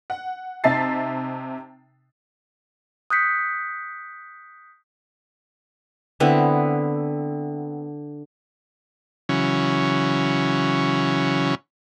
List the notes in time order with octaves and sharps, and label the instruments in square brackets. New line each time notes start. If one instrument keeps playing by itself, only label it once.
[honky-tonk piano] F#5
C3 D#4 E5 A5 A6 C7
[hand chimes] D#6 F#6 G6 B6 C#7
[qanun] D3 B3 C4 E4
[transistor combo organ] C#3 E3 F#3 C#4